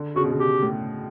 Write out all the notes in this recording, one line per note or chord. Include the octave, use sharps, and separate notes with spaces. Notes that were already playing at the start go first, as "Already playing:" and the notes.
Already playing: D3
C#3 F#4
B2
C#3
B2 G4
A2